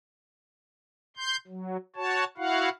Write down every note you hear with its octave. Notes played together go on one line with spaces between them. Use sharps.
C6 G6
F#3
F#4 C#5 A5
E4 F#4 F5 F#5